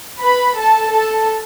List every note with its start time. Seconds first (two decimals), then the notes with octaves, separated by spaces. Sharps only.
0.21 B4 B5
0.58 A4 A5
0.94 A4 A5